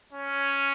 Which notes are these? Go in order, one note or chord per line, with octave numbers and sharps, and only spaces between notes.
C#4